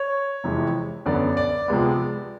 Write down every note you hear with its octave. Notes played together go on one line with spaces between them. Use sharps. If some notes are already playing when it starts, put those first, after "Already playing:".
Already playing: C#5
F2 C3 E3 G#3
F#2 D3 F#3 B3 D5
D5
C3 F3 G#3 B3